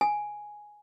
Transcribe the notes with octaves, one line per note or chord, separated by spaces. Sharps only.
G#5